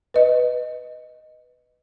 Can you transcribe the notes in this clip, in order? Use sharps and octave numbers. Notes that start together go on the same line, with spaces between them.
B4 D#5